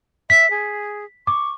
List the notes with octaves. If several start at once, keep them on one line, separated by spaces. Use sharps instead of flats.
E5 B6
G#4
C#6 D6